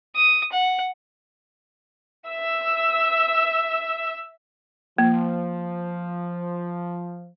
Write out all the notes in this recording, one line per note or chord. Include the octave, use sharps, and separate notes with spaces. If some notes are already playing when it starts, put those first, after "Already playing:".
D#6
F#5
E5 E6
F3 A#3